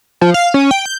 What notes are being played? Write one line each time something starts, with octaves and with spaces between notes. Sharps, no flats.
F3
F5
C#4
G5
G6